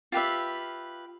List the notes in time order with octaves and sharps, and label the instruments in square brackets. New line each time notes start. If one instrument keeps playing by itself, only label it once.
[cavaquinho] F4 G4 B4 E5